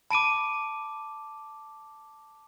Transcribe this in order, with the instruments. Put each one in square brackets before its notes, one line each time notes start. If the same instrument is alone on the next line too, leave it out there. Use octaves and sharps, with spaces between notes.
[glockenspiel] A5 D6 [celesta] B5 D7 D#7